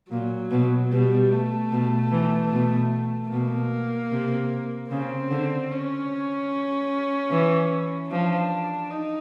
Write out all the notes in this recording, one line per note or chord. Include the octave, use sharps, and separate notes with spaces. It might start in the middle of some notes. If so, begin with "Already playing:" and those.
A#2 F#3
B2
B2 G3
A3
B2
E3
B2
B2 A#3
C3
C#3 C4
D3
C#4
E3
F3 D4
D#4